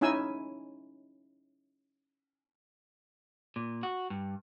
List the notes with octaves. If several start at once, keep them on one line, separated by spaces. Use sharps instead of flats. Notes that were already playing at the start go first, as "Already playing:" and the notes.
C#4 D#4 E4 G#5 E6
A#2
F#4
G2